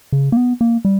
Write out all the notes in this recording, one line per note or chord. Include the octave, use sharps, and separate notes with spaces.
C#3
A#3
B3
A#3
G3